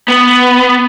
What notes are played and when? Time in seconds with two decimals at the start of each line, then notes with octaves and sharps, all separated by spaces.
0.08 B3